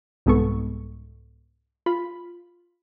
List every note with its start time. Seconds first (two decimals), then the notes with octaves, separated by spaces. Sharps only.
0.26 C2 G#2 G#3 B3 A4 C#6
1.86 F4 B5